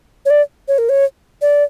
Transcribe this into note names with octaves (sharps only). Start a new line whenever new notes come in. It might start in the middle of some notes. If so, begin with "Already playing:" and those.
C#5
D5
C#5
A#4
C#5
D5